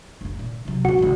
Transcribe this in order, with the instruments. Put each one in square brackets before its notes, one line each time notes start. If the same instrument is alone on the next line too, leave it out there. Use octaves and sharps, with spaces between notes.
[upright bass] F#1 A#3
A#2
C3 F#3
[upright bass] D#1 B3 [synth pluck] F#4
[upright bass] G#1 C#2